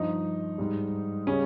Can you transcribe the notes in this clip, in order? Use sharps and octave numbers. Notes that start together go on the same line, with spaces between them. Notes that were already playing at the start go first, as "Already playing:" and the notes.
Already playing: G2 F3 D#4
G#2 G3
C#3 G3 C#4